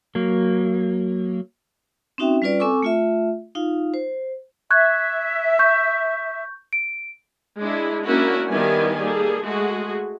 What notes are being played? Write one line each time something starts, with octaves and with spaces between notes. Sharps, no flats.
F#3 A#3
C4 C#4 D#4 F#4 E5 G5
G3 C#4 F4 B4 D5
C4 A4 G#5 C#6 D6 E6
A3 F4 E5
D#4 F4 F5
C5
E5 C#6 F#6 G#6
C#6 G6
D7
G#3 D4 E4
A#3 C#4 D4 E4 F#4 A#4
D#3 G3 B3 E4 G#5
G3 A#3 G#4 A4
G#3 A3 F#4 G#4